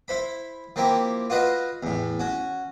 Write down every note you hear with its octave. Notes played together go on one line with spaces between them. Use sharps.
E4 C5 B5
F3 A#3 C4 E4 G4
F4 F#4 B4 D#5 F5
E2 A2
C#4 F#4